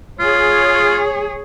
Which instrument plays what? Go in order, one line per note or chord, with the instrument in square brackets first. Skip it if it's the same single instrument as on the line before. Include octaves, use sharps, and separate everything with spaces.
[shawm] F4 [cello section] G#4 C#5